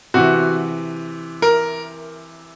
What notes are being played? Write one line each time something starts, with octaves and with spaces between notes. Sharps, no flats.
C3 E3 F#4
A#4